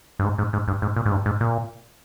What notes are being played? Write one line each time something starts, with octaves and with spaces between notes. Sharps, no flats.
G2
G#2
G#2
G#2
G2
G#2
A#2
G#2
G2
G#2
A#2